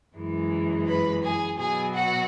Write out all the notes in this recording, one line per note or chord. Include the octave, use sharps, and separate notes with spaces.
F#2 E3 G#3
B4 B5
G#4 G#5
B2 F#3 G#4 G#5
F#4 F#5